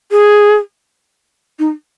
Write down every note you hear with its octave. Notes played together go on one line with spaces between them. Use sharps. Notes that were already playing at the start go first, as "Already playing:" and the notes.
G#4
D#4